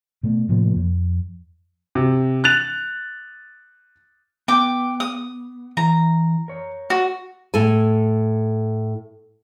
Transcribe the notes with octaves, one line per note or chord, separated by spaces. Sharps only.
B2 A3
A2 C3 F3 A#3
F2
C3
F#6 A6 F7
B3 G5 D6
D#6
E3 A#5
A#4 C#5
F#4
A2 A4 G#5